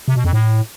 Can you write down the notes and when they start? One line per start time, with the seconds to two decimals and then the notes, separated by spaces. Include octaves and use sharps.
0.08 C3
0.16 B2
0.25 F2
0.33 A2